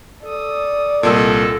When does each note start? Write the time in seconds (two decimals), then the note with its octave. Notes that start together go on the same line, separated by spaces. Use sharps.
0.23 A4 D5 D#6
1.03 C2 A#2 A4 A#4 D#5